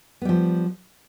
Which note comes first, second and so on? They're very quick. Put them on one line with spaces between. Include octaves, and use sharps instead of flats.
B3 G3 F3